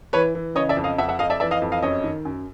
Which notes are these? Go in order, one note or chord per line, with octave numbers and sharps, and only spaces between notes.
E3 B4 C#5
E3
C#3 C#5 D#5
D5 E5
F2
D#5 F5
F2 E5 F#5
E5 F#5
F2 D#5 F5
D5 E5
E3 D5 E5
D#5 F5
F2
D#5 F5
F#2 C#5 D#5
D#3
F#2